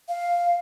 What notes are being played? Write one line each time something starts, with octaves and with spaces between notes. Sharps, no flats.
F5